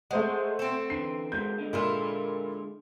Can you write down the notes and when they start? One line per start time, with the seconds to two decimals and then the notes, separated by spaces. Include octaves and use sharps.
0.11 G#3 A3 C5 F#5
0.59 C4 A4
0.90 D3 E3 C7
1.32 B2 G#3 A#3 G6
1.59 D3 G#3
1.73 A#2 E4 F4 A4 F6